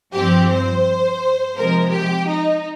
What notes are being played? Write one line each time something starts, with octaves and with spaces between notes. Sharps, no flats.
G2 F3 C4 G4
C5
C3 F3 G#3 A#4
G4
D#4